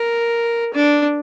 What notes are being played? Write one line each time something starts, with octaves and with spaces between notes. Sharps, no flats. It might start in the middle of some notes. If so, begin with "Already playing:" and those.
Already playing: A#4
D4